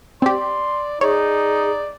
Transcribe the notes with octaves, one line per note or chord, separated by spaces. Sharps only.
C4 G4 D5 C6
D#4 G#4 C#5 D5